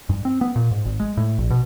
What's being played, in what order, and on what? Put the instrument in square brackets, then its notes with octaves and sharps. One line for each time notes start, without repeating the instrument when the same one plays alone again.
[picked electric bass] G2
C4
B3
A#2
G#2
G#1
G#3
A2
A#1
B2